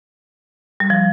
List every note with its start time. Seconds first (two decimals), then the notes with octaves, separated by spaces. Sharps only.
0.80 G3
0.90 F3